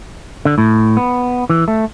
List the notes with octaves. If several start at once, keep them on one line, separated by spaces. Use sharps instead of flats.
D3
A2
B3
E3
A3